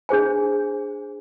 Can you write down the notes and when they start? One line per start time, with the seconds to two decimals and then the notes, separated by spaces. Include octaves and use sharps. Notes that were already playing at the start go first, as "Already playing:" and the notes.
0.09 D4 G#4 C5 G#5